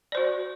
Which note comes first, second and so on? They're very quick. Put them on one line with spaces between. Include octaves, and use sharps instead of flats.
D5 C5 F#4